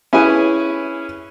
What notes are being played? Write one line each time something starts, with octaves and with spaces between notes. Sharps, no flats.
C#4 E4 G#4 B4 G#5